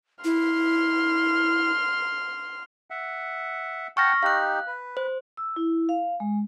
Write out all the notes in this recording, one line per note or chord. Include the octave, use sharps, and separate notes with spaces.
E4 C6 F6
E5 F#5
F#5 G5 A5 C#6 F6 A#6
D#4 G4 F5 F#6
B4
C5
E6
E4
F5
G#3